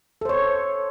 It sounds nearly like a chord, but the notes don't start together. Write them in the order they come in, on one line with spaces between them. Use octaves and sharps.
A4 C5 C#5